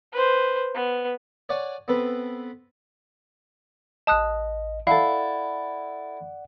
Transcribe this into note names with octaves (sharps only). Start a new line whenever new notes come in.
B4 C5
B3
C#5 D5 F#5 G#5
B3 C4 A4 B4
A1 D#5 A5 D#6 F#6
E4 A4 D5 F5 F#5